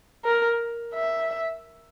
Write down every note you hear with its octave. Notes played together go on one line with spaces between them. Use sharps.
A#4
E5